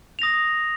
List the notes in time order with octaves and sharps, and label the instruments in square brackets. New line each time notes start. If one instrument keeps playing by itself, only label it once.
[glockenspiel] D#6 A#6 F7